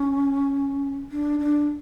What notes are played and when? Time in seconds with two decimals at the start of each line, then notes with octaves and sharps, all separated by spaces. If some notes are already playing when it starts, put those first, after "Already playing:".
Already playing: C#4
1.11 D4
1.39 D4